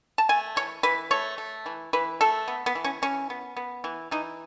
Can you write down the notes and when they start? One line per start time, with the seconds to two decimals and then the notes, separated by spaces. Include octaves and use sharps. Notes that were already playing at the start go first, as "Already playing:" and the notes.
0.18 A5
0.29 A3 G#5
0.56 E3 C#5
0.83 E3 B4
1.11 A3 C#5
1.38 A3
1.66 E3
1.93 E3 B4
2.21 A3 A4
2.48 B3
2.66 B3
2.75 E3
2.84 C#4
3.02 E3 C#4
3.30 B3
3.57 B3
3.84 E3
4.11 E3 D#4